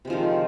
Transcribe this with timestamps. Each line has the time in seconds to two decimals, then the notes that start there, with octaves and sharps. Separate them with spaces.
0.05 C3
0.07 G#3
0.10 F3
0.13 D#3